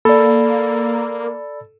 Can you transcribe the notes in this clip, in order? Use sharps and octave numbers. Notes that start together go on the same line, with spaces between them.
A#3 A4 D5 B5